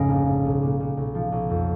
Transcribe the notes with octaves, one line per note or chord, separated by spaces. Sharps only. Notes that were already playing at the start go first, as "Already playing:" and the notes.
Already playing: F1 G#2 C#3 G#4 A#4 D#5
A#1
G#2
B1
A#2
A#2
B1
F3
B1
F2